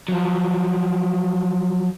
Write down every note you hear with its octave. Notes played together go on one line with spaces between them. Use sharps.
F3 F#3